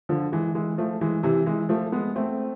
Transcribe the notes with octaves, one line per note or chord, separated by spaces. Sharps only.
D3 F3
E3 G#3
E3 G#3
F3 A3
E3 G#3
C3 E3
E3 G#3
F3 A3
G#3 B3
A3 C4